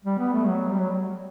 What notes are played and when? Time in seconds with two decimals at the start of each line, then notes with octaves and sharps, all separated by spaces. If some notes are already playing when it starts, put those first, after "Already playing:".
0.05 G3
0.19 B3
0.33 A3
0.47 F#3
0.71 G3
0.80 F#3